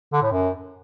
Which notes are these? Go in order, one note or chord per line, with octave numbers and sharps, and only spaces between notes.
D3
A2
F#2